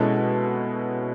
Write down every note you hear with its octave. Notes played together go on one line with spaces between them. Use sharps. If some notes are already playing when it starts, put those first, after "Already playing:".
Already playing: B2 G#3 C#4 E4 A4